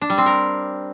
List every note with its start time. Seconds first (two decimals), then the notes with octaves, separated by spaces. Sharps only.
0.02 D4
0.10 G3
0.18 C4
0.26 A#4